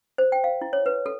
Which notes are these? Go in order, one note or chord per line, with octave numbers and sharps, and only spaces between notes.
C5
G5
F5
E4
C#5
B4
A4